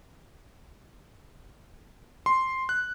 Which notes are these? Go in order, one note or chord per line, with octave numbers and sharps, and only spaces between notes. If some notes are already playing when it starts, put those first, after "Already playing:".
C6
F#6